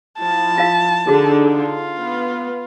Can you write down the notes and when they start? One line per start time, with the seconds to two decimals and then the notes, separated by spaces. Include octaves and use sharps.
0.19 F3 E4 A5
0.58 F4 F5
1.07 D3 D#4 F#4 G#4
1.57 F4
1.97 B3